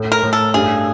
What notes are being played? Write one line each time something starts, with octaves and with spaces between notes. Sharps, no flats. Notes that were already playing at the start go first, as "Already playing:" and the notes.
Already playing: A2
A#4
A2
A4
G2 G#4